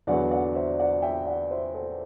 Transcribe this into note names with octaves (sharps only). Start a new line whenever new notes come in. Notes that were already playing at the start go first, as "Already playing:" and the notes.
E2 D3 F#3 B3 D4 D5 F#5
D5 F#5
C5 E5
D5 F#5
E5 G5
D5 F#5
C5 E5
A4 C5